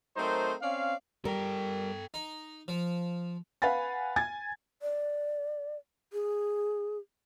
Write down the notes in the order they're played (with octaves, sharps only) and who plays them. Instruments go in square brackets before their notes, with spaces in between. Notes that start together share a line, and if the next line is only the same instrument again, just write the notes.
[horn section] F#3 A3 C4 D#4 A#4 C5
C4 C#4 D5 F5
[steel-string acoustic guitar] G3 [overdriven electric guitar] A4 G5 [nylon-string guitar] A#4
[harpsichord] D#4
F3
[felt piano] B4 F5 F#5 G#5 B5 A6
G#5 G#6 A6
[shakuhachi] D5
G#4